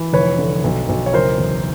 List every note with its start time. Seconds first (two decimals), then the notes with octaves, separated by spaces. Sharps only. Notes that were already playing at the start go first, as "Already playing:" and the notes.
Already playing: E3
0.13 F1 B4 C#5
0.39 D3
0.64 B1
0.89 B1
1.06 C#5
1.13 F#1 A#4 C5
1.38 E2